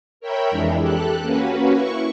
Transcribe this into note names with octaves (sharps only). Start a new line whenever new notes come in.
A#4 C#5 E5 G5 B5
F2 E3 G#3 D4
G4 A4 F#6
A#3 C#4 F#4 B4
E4 C#6